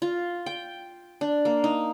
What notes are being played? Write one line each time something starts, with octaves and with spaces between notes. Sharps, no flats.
F4
G5
D4
A#3
D#4